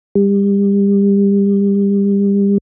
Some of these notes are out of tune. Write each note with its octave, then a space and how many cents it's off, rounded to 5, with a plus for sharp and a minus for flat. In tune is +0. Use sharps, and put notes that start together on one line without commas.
G3 +30